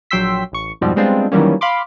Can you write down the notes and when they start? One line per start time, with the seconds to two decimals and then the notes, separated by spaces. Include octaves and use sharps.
0.11 A#1 F#3 G5 C6 E6 B6
0.52 A1 C#6
0.81 F2 G#2 B2 F3 G3 C4
0.96 G3 G#3 B3 C4 D4 F4
1.31 D#3 E3 F#3 G3 A#3 C#4
1.61 F5 B5 C6 D6